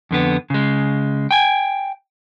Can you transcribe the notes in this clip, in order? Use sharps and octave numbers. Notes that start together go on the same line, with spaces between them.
F2 D3 B3
C#3 G#3
G5 G#5